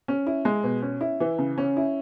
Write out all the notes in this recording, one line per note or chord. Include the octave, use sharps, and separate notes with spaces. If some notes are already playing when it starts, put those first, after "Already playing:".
C#4
E4
G#3
B2
C#4
E4
E3
C#3
C#4
E4